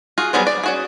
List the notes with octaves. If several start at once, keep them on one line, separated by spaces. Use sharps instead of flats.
F4 F#4 G#4
F#3 G3 B3 G#4 C5
D5
C#4 F#4 G#4